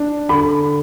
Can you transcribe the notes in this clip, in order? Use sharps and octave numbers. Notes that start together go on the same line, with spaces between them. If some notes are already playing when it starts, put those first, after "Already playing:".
Already playing: D4
D3 B5